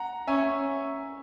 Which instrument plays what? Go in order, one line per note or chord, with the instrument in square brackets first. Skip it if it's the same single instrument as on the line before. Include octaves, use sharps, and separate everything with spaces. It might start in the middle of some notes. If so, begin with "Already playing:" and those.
Already playing: [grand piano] F#5 A#5
[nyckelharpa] C#4 [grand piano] E5 G#5